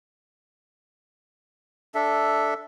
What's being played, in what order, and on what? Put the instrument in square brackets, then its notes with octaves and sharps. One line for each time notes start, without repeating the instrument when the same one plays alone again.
[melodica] D4 A4 E5